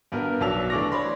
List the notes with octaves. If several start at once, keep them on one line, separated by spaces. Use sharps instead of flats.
G2 B3 A#4
B1 F#3 D5 A5 E6 F7
E3 A3 D4 C#6 D6 A#6
C#5 D5 B5 C6